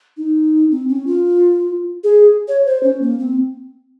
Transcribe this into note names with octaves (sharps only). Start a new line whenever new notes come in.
D#4
C4
C#4
F4
G#4
C#5
C5
C#4
A#3
C4